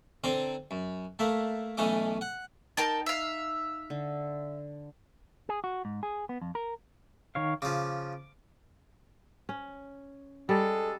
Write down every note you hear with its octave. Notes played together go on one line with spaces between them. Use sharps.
D3 C4 C5 D5 A#5
F#2
A3 A#3 E5
B1 E3 A3 C#4 D#5 D6
F#5
D#4 A#4 G5 A5
E5 F5
D3
G#4
F#4
G#2
G#4
B3
F2
A#4
D#3 C#5 F5
C#3 F3 D6
C#4
G3 G#3 A4